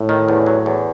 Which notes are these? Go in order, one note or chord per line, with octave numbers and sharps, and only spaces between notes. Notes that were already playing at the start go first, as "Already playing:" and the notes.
Already playing: A2
D#3
E2
F#3
E2